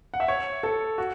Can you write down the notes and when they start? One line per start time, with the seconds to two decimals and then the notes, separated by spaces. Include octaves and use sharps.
0.14 F#5
0.20 E5
0.28 C#5
0.63 A4
0.98 F#4